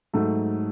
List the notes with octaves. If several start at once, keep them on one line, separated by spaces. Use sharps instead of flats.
G#2 F#3 A3